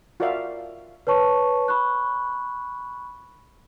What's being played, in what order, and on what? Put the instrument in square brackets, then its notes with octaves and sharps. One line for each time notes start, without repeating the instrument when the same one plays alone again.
[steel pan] F4 F#4 A#4 D5 E5 F5
[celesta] B4 C#5 A5 C#6
B5 C#6 F#6